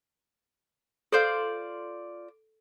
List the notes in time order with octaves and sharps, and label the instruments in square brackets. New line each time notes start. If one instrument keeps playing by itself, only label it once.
[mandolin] F4 C5 D5 [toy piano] A4